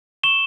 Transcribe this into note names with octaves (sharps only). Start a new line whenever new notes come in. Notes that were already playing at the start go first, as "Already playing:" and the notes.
C#6 E7 G7